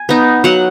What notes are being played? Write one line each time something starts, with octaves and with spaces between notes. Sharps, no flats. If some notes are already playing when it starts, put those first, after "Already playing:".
Already playing: G#5
B3 D#4
F#3 F#5